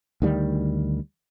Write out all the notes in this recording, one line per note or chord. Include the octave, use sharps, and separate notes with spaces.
D2 D#3 G3